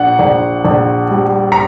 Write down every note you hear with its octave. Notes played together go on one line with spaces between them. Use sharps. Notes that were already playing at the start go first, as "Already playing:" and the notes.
Already playing: A#1 F#5
A#1
A#1
G3
A#5